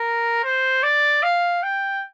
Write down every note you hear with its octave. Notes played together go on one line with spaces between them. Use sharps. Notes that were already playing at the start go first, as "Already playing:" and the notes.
Already playing: A#4
C5
D5
F5
G5